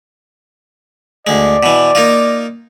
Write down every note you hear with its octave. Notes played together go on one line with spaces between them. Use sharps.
D2 G#3 D5
B2 E3
A#3 D#4 F4